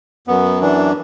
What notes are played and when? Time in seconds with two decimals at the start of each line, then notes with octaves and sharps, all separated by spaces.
0.28 F#2 B3
0.61 E3 D4